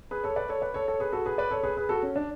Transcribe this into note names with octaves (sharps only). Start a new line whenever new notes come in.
G#4 B4
A4 C#5
B4 D5
A4 C#5
B4 D5
A4 C#5
A4 C#5
G#4 B4
F#4 A4
G#4 B4
B4 D5
A4 C#5
G#4 B4
G#4 B4
F#4 A4
C#4
D4